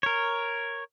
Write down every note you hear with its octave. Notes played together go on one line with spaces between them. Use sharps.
A#4 C#5